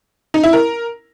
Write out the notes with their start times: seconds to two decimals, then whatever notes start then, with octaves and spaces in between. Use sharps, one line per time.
0.34 D#4
0.44 E4
0.53 A#4